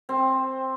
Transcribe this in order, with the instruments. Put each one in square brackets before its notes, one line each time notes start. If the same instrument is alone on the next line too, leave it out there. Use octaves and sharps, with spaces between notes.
[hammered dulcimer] C4